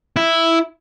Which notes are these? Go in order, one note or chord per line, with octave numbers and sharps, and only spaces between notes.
E4